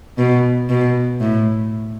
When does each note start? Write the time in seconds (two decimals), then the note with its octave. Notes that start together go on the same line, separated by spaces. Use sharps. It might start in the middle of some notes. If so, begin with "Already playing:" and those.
0.18 B2
0.69 B2
1.20 A2